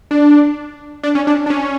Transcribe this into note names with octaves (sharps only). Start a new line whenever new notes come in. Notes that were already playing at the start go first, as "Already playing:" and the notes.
D4
D4
C#4
D4
D4
C#4